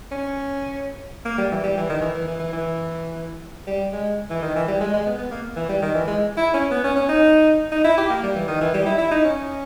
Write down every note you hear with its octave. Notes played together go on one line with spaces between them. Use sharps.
C#4
A#3
G3
E3
G3
E3
D#3
E3
E3
E3
E3
E3
G3
G#3
E3
D#3
E3
G3
G#3
G#3
B3
B3
A#3
E3
G3
D#3
E3
G#3
E4
C#4
B3
C#4
C#4
D#4
D#4
E4
G4
A#3
G3
E3
D#3
E3
G3
E4
E4
D#4
C#4